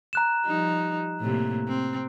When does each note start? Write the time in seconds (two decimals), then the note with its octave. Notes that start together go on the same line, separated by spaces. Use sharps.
0.13 A#5 F#6 E7
0.46 F3 G3 D#4
1.21 A2 C3 A#3
1.68 C4